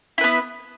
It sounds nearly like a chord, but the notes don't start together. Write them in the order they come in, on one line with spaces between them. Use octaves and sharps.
E4 B4 B3